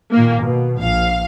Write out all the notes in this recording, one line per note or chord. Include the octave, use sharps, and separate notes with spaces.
A#2 D#3 A#3
B2
A#1 F5